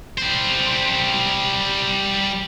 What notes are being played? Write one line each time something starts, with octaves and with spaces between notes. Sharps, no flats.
G3 C5